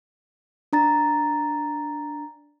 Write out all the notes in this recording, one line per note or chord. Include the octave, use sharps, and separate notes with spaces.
D4 A#5 A6